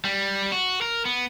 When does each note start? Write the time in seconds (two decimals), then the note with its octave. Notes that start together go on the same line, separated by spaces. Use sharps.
0.05 G3
0.52 F#4
0.81 A#4
1.05 B3